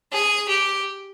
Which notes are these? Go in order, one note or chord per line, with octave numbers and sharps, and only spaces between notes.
G#4
G4